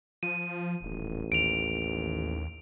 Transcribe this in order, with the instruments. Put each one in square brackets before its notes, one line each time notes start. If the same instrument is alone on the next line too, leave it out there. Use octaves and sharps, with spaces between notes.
[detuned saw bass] F3 [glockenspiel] D#7
[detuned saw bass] D#1 [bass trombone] A1
[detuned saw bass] D#2 [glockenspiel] D7 F7